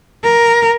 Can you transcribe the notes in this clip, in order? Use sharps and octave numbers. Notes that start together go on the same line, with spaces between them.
A#4